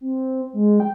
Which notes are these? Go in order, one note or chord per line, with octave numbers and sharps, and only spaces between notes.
C4
G#3
G5